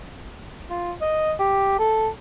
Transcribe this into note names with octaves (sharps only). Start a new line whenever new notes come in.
F4
D#5
G4
A4